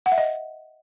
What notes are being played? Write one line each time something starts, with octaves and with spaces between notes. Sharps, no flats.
F#5
E5
D#5